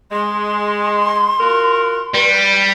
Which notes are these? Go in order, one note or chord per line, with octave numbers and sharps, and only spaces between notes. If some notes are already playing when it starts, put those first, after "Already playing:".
G#3 C6
F4 F#4 A#4
G3 B4